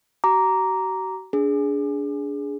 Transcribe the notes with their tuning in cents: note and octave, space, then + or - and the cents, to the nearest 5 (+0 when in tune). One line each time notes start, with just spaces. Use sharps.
F#4 +40 A#5 +0 D6 -15
D4 -25 G#4 +0